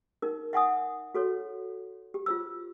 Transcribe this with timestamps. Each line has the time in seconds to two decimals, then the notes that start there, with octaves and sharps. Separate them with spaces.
0.22 D#4 A#4
0.53 E5 F#5 G#5 D#6
1.14 F#4 A4 C#5
2.14 G4
2.26 F4 C5 E6